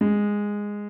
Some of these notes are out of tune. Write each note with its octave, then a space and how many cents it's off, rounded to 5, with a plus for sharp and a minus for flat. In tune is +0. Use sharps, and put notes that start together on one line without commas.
G#3 -10